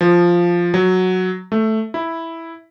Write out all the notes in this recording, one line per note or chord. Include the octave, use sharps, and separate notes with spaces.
F3
F#3
A3
E4